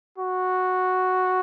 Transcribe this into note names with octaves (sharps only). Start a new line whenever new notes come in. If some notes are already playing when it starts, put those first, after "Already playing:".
F#4